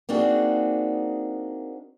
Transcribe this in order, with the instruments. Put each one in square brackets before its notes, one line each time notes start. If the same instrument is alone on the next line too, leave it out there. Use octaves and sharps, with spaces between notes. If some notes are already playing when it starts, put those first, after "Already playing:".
[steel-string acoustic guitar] A#3 C4 D4 D#4 F#4 G#4